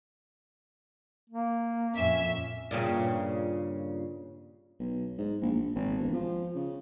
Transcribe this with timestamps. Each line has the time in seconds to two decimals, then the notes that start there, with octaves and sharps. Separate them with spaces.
1.30 A#3
1.95 F2 A#2 C#4 E5
2.71 G2 A#2 C#3
4.80 B1
5.18 G#2
5.42 A#1
5.54 A#1
5.75 G#1
5.98 E1
6.13 F3
6.55 C#3